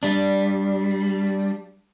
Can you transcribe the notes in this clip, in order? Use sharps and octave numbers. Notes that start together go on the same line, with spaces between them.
G3 D4